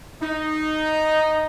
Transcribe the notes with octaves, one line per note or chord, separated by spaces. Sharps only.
D#4